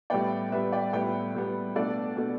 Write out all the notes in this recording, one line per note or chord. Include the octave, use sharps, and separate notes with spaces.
A2 G3 B3 D5 G5
A2 G3 B3 B4 E5
D5 G5
A2 G3 B3 D5 G5
A2 G3 B3
B2 A3 D4 A4 D5
B2 A3 D4